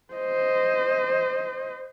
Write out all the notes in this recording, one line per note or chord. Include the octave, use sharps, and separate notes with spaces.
C5 D#5